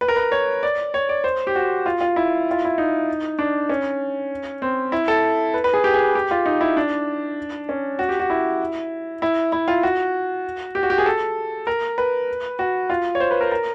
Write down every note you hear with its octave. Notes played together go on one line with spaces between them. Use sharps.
B4
A#4
B4
C#5
D5
C#5
D5
C5
G4
F#4
F4
F4
E4
F4
E4
D#4
D4
C#4
C4
E4
A4
B4
B4
G#4
G4
G#4
G4
F4
D#4
E4
D4
C#4
F#4
G4
F#4
E4
E4
E4
F4
F#4
G4
F#4
G4
G#4
A4
A#4
B4
F#4
F4
C#5
C5
B4
A#4
A#4